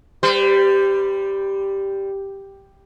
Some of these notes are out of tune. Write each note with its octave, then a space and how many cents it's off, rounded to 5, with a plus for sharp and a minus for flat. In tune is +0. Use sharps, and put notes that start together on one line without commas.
G3 +0 C5 -40